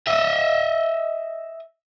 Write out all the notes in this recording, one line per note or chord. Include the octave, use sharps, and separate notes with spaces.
D#5 E5